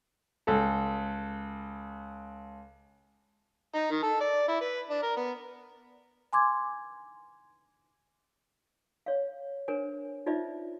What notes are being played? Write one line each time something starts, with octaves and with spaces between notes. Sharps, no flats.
C#2 A4
D#4
D#3
A4
D5
E4
B4
D4
A#4
B3
G#5 C6 D6 G#6
C#5 F5
D4 A#4 C5 C#5 G#5
D#4 F4 C5 D5 E5